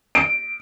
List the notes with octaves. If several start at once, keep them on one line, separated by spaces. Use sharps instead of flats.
D7